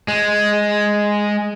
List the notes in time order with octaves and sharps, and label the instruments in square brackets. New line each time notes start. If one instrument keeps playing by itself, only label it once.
[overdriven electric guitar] G#3